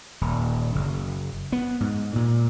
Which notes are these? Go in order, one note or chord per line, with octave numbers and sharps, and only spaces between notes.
D#1
F#1
B3
G#2
A#2